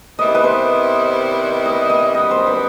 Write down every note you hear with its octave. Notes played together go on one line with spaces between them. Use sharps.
C3 D#3 G3 B3 E4 D#5
B4
C5
D#5
D#5
F#2 D#3 G3 B3 D#5
C5
B4